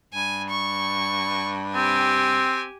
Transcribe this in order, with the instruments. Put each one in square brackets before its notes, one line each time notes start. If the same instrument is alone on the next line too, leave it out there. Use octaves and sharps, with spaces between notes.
[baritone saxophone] G2 [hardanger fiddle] G#5
[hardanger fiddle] C#6
[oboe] C4 [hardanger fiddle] G4 G#5